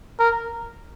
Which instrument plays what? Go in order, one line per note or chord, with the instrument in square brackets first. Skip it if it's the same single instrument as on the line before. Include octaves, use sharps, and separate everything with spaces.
[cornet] A#4